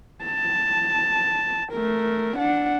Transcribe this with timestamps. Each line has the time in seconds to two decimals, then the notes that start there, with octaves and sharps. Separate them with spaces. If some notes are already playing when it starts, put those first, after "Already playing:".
0.24 A5
1.72 A3 A#4
2.38 D4 F#5